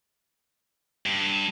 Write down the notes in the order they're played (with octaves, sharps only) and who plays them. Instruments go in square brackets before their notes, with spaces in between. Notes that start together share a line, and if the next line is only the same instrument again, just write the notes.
[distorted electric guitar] G2